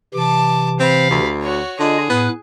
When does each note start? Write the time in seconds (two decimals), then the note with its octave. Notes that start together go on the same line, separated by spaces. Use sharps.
0.14 C3 E3 A5 D6
0.80 C4 F5 B5
1.11 D2
1.42 F#4 C#5
1.80 D3 F4 G#4 D#5
2.10 A2 B3 F#6